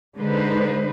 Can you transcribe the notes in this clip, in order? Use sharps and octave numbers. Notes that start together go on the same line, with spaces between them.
D3 G#3 D#4 B4 C5